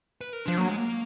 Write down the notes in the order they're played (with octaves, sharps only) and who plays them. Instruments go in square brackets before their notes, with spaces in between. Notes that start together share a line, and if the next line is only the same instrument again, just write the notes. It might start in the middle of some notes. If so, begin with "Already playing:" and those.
[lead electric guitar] B4
A#4
[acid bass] F3 [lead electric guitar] D4
[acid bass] F#3 [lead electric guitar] A#3
[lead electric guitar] G#3
A#3